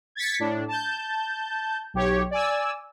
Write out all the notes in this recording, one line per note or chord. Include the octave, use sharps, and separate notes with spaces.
G#6 A6 B6 C#7
A2 D4
A5 G6
B1 G4 C#5
D5 G#5 E6